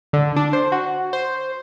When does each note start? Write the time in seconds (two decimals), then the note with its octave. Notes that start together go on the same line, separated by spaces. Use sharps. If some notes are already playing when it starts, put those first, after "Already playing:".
0.13 D3
0.36 D4
0.53 C5
0.72 F#4
1.13 C5